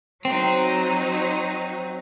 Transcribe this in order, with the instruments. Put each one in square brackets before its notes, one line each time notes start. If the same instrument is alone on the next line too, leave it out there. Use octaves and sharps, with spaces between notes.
[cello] F#3 [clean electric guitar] C4 [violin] D#4 C5